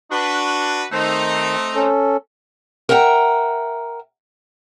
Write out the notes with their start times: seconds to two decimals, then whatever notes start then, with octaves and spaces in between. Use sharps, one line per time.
0.11 D4 F#4 B4
0.92 D#3 A3 C4 D#4
1.75 C#4 A4
2.89 A#4 E5 F#5 G5 A#5